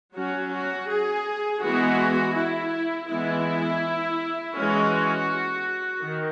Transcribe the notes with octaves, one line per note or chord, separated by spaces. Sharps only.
F#3 C#4 F#4
F#4
G#4
E3 G#3 B3 F#4
E4
E3 G#3 B3 E4
E3 G#3 C#4 F#4
D#3